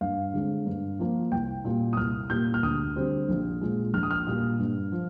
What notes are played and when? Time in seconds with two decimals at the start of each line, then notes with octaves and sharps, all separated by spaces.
0.01 G2 F5
0.33 D3 G#3 C4
0.66 G2
0.99 F3 A#3
1.32 C2 G5
1.65 A#2 G3 A#3
1.93 D#6
1.97 C2 F6
2.30 A#2 G3 A#3 G6
2.54 F6
2.63 D2 D#6
2.96 D3 G3 C4
3.29 A#1
3.61 A#2 G#3
3.94 A#1 F6
4.03 D#6
4.11 F6
4.27 A#2 G3 A#3
4.59 G2
4.92 F3